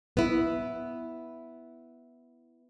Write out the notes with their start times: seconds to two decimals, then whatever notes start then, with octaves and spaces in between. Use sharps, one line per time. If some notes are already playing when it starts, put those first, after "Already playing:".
0.17 B3 E4